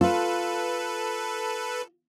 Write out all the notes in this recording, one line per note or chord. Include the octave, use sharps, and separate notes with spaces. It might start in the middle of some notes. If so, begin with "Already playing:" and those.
F4 A4 B4